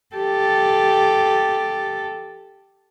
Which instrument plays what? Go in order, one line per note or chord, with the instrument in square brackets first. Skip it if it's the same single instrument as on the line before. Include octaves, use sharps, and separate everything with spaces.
[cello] G4 A4